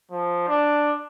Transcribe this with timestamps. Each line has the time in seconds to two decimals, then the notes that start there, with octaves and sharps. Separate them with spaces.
0.11 F3
0.48 D4